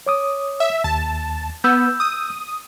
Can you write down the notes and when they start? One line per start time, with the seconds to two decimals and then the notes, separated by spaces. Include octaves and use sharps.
0.06 C#5 D6 D#6
0.60 E5
0.84 D#2 A5
1.64 B3 E6 G6
2.00 D#6